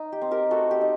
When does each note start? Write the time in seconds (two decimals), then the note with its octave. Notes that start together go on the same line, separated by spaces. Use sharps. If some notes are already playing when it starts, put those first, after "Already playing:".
Already playing: D#4
0.12 G4
0.21 C4
0.31 G4 A#4
0.51 A3 F#4 A4
0.71 G4
0.81 D#4